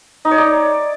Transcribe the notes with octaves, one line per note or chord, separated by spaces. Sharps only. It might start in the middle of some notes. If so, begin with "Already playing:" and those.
D#4
C#5
D5